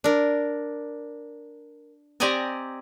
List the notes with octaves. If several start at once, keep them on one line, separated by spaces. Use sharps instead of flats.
D4 A#4
C4 G4 D5 D#5 G#5 A#5